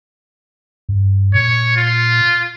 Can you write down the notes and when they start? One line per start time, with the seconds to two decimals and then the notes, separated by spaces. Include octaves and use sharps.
0.89 G2
1.35 A#2 C#5
1.76 F4